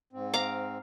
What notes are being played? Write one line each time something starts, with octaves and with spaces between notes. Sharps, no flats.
G#2 C4
F5 A#5 D6